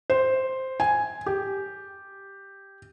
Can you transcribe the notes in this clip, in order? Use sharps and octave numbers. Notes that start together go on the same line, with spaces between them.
C5
G#5
G4